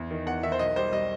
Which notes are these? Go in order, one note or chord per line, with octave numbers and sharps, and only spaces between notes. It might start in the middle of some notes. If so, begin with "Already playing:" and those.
Already playing: E2
D#3
E2 F#5
D#3 E5
C5
B1 D#5
G3 C5
G3 D#5